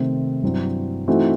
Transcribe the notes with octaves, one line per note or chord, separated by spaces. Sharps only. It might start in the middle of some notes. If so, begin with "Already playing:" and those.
Already playing: C3 D#3 A3 C4
G2 F#3 C4 E4
E3 A3 C4 D#4 F#4